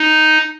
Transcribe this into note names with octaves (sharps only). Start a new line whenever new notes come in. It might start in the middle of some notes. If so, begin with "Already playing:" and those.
Already playing: D#4